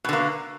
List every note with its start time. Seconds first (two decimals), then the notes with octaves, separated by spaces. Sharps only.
0.04 B2
0.09 D3
0.13 A#3